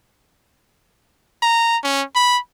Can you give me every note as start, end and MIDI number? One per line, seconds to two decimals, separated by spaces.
1.42 1.77 82
1.83 2.03 61
2.15 2.38 83